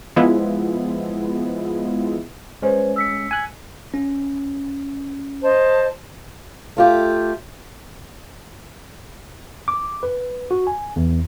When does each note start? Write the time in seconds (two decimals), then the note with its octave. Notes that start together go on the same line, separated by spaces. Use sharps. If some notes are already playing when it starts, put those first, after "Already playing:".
0.16 F3 G#3 B3 E4
2.62 G#3 C#4 B4 C5
2.96 E6 B6 C#7
3.31 G#5 F#6
3.94 C#4
5.42 C5 D#5 A5
6.77 A3 F4 G4
9.68 D6
10.03 B4
10.51 F#4
10.67 G#5
10.96 E2